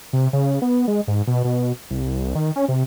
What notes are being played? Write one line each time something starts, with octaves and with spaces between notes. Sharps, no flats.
C3
C#3
B3
G#3
G#2
B2
B2
C2
D#3
C#4
C3